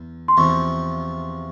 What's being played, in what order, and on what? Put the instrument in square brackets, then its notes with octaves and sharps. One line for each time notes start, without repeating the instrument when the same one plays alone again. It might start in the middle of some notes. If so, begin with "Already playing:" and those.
Already playing: [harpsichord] E2
[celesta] C6
[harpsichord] E2 C3 F3 [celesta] C#6